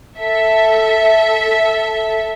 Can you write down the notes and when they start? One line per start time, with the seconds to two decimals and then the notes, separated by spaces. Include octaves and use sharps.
0.18 A4 E5